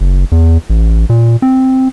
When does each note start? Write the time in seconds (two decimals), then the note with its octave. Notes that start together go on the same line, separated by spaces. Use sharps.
0.01 F#1
0.32 E2
0.70 A1
1.10 A#2
1.42 C4